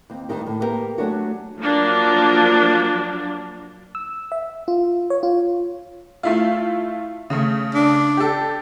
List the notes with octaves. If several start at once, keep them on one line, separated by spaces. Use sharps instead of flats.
D#2 C4
D2 G2 D#3 D#4 G4
A2
A#3 B3 E4 G4 A#4
F#3 A3 C#4 D4 F#4
F3 F#3 A#3 D4
E6
E5
F4
C#5
F4
A3 E4 F4
C#3 A3
D4
G4 A4